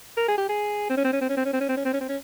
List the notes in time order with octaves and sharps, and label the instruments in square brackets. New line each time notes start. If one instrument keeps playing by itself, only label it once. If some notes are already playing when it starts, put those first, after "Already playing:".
[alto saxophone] A#4
G#4
G4
G#4
C4
C#4
C4
C#4
C4
C#4
C4
C#4
C4
C#4
C4
C#4
C4
C#4
C4
C#4